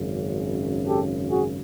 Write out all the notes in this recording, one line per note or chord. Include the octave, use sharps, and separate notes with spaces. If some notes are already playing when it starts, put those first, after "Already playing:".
Already playing: G#1 F#2 C#3
G4 A4
F#4 G#4